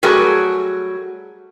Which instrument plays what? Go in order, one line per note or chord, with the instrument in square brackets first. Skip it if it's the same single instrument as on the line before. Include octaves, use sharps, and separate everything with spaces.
[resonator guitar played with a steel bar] F#3 G3 A3 F#4 G#4 A#4